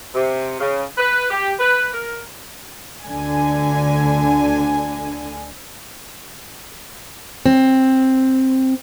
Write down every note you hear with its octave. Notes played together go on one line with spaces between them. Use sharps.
C3
C#3
B4
G4
B4
A#4
D2 D3 G#5
C4